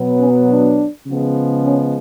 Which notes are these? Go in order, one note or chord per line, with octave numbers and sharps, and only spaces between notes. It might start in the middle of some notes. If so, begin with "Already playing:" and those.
Already playing: B2 F#3 B3
C#4
D4
C#3 F3 G#3 B3
C#4